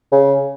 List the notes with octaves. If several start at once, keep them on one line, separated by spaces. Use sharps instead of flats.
C#3